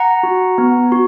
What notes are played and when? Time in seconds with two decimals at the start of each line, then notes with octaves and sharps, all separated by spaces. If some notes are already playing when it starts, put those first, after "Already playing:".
Already playing: F#5 A#5
0.23 F#4
0.58 B3
0.92 F#4